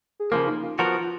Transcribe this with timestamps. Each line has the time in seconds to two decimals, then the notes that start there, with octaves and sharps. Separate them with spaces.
0.20 G#4
0.31 C#3 F3 A#3 A#4
0.47 D#4
0.63 F4
0.79 F3 B3 F4 F#4 A#4
0.95 F4